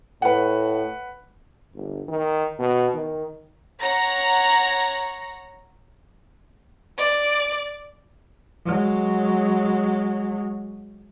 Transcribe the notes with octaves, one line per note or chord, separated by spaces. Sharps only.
A2 B4 F#5
G1
D#3
B2
D#3
C#5 F#5 A#5 A#6
D5
F#3 G#3